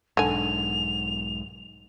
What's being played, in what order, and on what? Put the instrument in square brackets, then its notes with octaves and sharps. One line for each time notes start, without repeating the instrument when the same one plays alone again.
[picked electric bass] B1 G#2 [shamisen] D3 G#5 [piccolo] F7